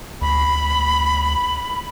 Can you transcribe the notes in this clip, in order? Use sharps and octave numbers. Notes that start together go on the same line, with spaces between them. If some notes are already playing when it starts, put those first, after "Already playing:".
D2 B5